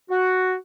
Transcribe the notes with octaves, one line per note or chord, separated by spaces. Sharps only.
F#4